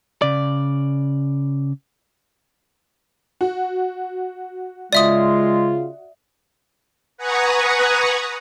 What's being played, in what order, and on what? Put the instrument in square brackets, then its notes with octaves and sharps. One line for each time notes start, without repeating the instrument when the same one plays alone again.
[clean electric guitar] C#3 D5
[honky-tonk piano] F#4
[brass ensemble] C#3 F4 [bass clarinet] G#3 [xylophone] D5 E5 D#6
[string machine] B4 F#5 G#5 A#5 C#6 D#6